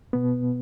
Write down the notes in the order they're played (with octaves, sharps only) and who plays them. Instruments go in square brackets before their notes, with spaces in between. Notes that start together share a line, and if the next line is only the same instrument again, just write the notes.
[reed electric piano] B2 B3